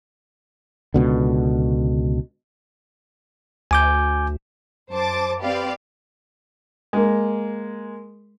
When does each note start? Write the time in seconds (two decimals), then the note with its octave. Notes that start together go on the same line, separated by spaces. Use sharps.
0.94 C#2 B2 D3
3.71 D2 G#5 D6 G6
4.91 F#2 C5 A5 D6 A6
5.41 C4 G4 B4 D5 F5
6.93 G#3 A#3